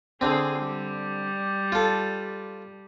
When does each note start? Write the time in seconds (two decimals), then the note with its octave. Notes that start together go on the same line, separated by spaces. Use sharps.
0.21 D3 C4 G#4
0.60 G3
1.72 F4 A4